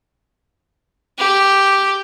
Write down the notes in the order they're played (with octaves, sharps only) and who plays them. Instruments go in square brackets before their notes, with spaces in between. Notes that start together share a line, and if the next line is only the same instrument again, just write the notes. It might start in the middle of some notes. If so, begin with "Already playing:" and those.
[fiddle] G4